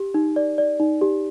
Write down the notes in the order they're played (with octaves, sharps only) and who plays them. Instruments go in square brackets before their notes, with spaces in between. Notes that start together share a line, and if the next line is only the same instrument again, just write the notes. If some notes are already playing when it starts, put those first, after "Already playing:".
Already playing: [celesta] G4
D#4
D5
D5
D#4
G4